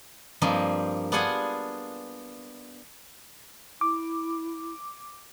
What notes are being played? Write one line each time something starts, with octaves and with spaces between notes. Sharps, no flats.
G2 F3 A#3 C4 D#5
B3 D4 F4 G#4 F#5 G#5
E4 D6